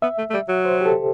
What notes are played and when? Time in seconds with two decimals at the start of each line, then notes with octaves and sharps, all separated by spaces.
0.02 B3 E5
0.18 A3
0.30 A3
0.34 G3
0.49 F#3
0.65 C5
0.81 G4
0.86 A4